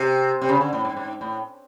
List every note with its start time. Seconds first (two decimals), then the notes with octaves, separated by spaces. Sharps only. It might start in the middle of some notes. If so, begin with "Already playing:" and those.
Already playing: C3
0.42 C3
0.49 C#3
0.61 D3
0.73 A2
0.85 G#2
0.97 G#2
1.21 A2